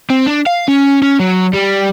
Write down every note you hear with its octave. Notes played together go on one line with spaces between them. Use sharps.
C4
D4
F5
C#4
C#4
F#3
G3